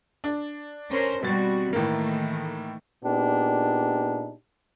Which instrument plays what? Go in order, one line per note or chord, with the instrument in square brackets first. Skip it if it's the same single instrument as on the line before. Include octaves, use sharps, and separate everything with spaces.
[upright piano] D4
[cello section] C#4 A#4 C5
[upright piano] B2 A6 [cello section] G3 C4 F#4
[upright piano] A2 A#3 [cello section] D#3 E3 A3
[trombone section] A#2 B3 D4 D#4 G4 G#4